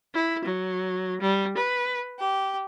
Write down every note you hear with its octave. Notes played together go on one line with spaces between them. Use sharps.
E4
F#3
G3
B4
G4